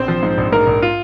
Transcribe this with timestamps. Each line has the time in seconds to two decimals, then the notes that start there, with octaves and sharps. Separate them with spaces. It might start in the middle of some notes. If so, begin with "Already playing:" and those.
Already playing: A#1 C4 C5
0.08 F3
0.23 G#2
0.38 A#1
0.52 G#2 A#3 A#4
0.67 A#1
0.82 F4